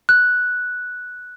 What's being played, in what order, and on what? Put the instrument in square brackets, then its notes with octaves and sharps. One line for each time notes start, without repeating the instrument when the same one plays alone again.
[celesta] F#6